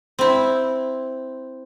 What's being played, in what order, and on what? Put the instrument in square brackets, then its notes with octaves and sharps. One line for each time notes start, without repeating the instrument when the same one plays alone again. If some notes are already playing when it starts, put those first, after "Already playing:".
[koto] C4 E4